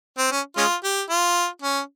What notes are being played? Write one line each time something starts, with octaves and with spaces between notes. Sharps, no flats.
C4
C#4
G#3 C#4 F4
G4
F4
C#4